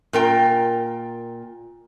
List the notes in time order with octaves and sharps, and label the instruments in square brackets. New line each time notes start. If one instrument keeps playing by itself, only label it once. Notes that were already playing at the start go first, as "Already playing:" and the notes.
[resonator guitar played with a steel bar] A#2 A#4 G5